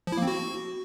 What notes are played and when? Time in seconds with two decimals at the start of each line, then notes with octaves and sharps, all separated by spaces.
0.07 F3
0.12 E4
0.17 A#3
0.22 C4
0.28 F#4